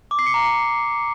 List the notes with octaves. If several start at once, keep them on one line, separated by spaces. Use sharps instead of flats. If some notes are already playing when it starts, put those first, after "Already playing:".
D6
C7
C#7
A#5